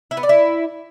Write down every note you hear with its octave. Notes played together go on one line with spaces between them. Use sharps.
E4
B3
D5
E4